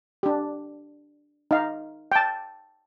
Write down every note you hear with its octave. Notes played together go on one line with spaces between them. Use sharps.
D4 G4
D#4 F5
G5 A5